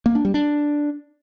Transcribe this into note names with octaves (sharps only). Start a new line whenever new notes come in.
A#3
D4
G3
D4